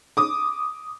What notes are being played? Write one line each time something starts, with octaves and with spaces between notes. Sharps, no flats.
D6 D#6